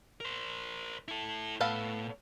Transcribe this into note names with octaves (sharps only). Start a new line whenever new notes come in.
A#4 C5
E4 A4
A2 B3 A4 F5